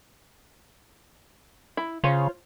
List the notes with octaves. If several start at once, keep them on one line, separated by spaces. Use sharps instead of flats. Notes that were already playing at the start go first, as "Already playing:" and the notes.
E4
C#3 F4 C5 C#5